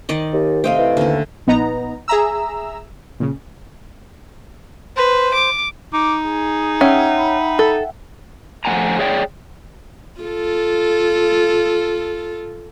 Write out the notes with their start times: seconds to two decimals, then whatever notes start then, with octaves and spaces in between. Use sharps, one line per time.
0.09 D#3 D5 D#5
0.33 D#2
0.64 C3 A3 C5 D#5 F5 G5
0.78 E3
0.97 D#2 D3 C#4
1.47 A#1 B3 D#4 A#5
2.08 G#4 E5 A#5 E6
3.20 A#2 C#3
4.97 B4 C5
5.34 D6
5.94 D#4 D6
6.26 G#4
6.81 C#4 E5 F#5 G5
7.18 B5
7.59 A4
8.65 F3 A3 A#3 F#5 G#5 A#5
8.99 G#4 C#5 D5 G5
10.20 F4 A4